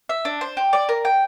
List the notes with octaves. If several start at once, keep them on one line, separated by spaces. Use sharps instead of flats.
E5
D4
C5
G4
D5
A#4
G5